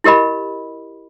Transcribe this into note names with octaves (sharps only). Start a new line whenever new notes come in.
E4 G4 A#4 D#5 B5